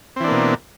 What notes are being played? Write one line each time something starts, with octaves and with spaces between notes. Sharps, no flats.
B2 E3 A#3 C4 D4